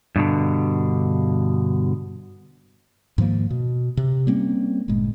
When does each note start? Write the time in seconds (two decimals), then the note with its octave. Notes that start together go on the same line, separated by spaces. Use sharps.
0.16 G2 B2 D3
3.18 G#2 D#3 F3 A#3
3.50 B2
3.97 C3
4.27 G3 A#3 C4 C#4
4.88 G1 A#2 G#3